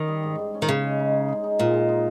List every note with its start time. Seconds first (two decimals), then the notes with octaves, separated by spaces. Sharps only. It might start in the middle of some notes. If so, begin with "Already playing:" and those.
Already playing: D#3 C#4
0.08 G3
0.23 G#2
0.39 G#2
0.54 C#4
0.62 D#3
0.68 C#3 G#4
0.84 G#3
0.99 D#4
1.14 D#4
1.28 G#4
1.44 D#4
1.58 A#2 G#4
1.74 G#3
1.89 D#4